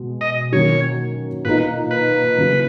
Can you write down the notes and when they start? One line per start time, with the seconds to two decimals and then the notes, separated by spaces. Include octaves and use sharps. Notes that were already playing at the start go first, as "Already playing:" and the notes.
Already playing: B2 G#3
0.21 D#5
0.52 D#3 F#3 A#3 C#4 C#5
1.45 A#2 A#3 D#4 B4
1.91 B4
2.37 C#3 F#3 A#3 E4